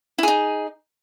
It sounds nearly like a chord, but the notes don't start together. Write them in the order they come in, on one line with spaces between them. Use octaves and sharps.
E4 G#4 D#4